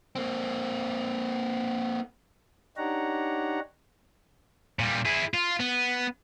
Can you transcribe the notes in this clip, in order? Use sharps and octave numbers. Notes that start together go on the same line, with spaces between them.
A#3 C4
D4 D#4 G4 C#5 F#5 A#5
A#2 G3
E4 G#4
F4
B3